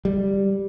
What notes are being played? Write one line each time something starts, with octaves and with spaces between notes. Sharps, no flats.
G3